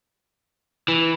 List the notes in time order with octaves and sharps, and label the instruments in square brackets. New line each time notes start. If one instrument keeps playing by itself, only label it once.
[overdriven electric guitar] E3